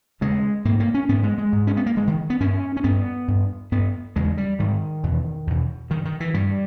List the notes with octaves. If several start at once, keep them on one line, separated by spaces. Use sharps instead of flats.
E2 C#3 G#3
G#2 A#3
A#3
C#4
G#2 B3
G#3
G#3
G#2
C#4
B3
A#3
G2 G#3
D#3
B3
G2 C#4
C#4
G2 B3
G2
G2 B3
E2 C#3 G#3
G3
G#2 D#3
E2 B2
E2 B2
G2 D#3
D#3
E3
G2 G3